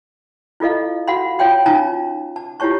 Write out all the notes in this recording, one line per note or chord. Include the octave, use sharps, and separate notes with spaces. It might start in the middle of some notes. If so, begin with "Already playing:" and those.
E4 F4 A4 D#5 F5
F#4 F5 F#5 B5 C6
F4 C#5 F5 G5 C6
C#4 D#4 F4 G#5 A#5
A5
E4 F4 G4 C#5 A5 C#6